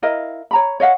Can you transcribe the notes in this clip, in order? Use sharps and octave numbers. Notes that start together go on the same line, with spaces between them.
E4 A#4 D#5 F5
C#5 A#5 B5
C#5 D#5 F5 F#5